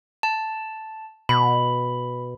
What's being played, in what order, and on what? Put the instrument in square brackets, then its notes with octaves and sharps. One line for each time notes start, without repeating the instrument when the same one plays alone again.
[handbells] A5
[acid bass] B2 [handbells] B5